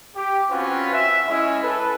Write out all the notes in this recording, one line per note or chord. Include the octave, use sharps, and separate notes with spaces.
G4
C4 C#4 F4 F#4 B4
E5
G#3 C#4 E4
A4 B4